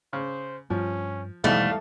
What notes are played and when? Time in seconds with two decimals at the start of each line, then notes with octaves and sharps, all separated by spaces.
0.13 C#3 C5
0.70 G2 F3 C#4
1.44 E2 G#2 B2 E3 F3 G3 A3 F5